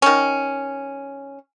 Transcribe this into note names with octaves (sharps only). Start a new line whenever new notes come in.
D#3 C#4